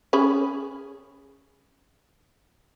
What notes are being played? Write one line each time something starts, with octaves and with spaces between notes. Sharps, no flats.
C#4 G#4 B5